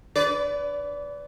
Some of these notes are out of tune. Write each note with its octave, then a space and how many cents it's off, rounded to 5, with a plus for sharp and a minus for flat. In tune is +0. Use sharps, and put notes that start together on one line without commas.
B4 +20 D5 -25